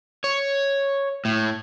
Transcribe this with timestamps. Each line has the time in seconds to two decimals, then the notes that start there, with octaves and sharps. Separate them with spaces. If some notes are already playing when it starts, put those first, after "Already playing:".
0.24 C#5
1.25 A2